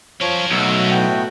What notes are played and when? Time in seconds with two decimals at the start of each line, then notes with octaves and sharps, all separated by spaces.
0.21 F3 C#4 A#4 C#5
0.51 B1 A3 F#4 E6
0.91 A2 B3 G5